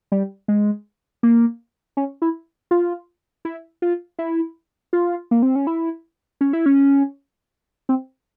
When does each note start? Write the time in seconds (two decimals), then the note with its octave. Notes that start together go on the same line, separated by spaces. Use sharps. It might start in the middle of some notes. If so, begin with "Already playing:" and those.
0.12 G3
0.48 G#3
1.23 A#3
1.97 C#4
2.22 E4
2.71 F4
3.45 E4
3.82 F4
4.19 E4
4.93 F4
5.31 A#3
5.43 C4
5.56 C#4
5.67 E4
6.41 C#4
6.53 E4
6.66 C#4
7.89 C4